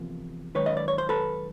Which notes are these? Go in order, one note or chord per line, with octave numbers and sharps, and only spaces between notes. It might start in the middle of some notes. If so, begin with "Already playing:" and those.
Already playing: E2 C3 F3 A#3
F#2 D#3 G#3 B4 C#5
D#5
D5
C#5
C5
A4 B4